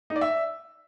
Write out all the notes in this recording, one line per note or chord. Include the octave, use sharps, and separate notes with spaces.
D#4
D5
E5